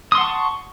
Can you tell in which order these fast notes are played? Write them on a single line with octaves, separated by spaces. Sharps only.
D#6 C6 F#5 A5 C#6